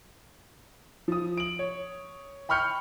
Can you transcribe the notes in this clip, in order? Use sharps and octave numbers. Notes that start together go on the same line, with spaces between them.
F3 D#6
D7 F#7
C#5
G5 B5 C#6 F6 G6 C#7